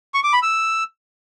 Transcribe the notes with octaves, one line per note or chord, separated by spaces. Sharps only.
C#6
D6
B5
E6